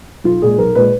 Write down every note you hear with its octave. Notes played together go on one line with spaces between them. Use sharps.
B1 F4
A#2 G#3 G#4
B1 A#4
A#2 G#3 B4